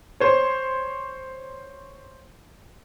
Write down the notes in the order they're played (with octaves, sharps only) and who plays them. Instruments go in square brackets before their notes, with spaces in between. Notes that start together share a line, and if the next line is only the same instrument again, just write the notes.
[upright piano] C5 C#5